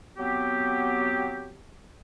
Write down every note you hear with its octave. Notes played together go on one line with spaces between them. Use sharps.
F#3 B3 C4 G4